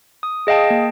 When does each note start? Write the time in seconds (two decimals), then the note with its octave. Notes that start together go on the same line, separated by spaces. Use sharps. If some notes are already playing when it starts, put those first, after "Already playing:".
0.23 D#6
0.47 G#4 D#5 F5 G5 A5
0.70 A#3